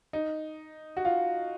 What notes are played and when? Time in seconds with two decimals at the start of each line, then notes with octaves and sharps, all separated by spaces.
0.13 D#4
0.97 F#4
1.05 F4